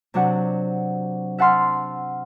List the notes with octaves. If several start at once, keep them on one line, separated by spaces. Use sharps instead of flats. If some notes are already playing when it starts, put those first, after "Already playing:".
C3 F#3 D4 F#5
E5 F#5 A5 C6 F6